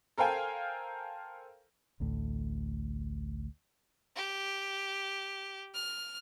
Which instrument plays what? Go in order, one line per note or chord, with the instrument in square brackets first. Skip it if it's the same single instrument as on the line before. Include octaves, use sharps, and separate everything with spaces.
[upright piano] A4 A#4 C5 F5 G5 G#5
[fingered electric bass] A1 D2 A2
[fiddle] G4
F6